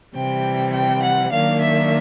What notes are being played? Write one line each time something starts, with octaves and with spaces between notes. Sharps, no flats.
C3 E3 G3 C4 G5
G5
F#5
D#3 F#3 A#3 D4 F5
E5